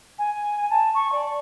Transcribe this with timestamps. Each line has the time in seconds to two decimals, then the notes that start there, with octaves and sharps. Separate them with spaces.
0.18 G#5
0.70 A5
0.94 C#6
1.12 D5